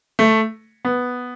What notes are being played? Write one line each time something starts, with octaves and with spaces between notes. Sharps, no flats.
A3
B3